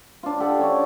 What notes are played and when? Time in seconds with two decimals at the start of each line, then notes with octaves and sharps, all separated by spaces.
0.23 D4 F4
0.40 G4 A4 F#5
0.59 C#4 C#5 D5